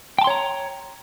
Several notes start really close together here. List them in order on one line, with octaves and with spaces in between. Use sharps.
G5 A5 C6 C#5 A#5